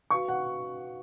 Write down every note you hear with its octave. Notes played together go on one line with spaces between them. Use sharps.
F#4 B4 F5 C#6
F#5